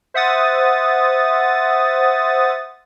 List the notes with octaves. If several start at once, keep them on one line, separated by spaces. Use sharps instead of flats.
C5 E5 F#5 D#6 A6